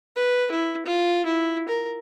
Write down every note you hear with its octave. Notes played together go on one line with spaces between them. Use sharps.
B4
E4
F4
E4
A#4